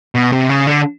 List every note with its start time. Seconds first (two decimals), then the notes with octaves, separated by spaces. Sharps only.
0.15 B2
0.32 C3
0.49 C#3
0.67 D3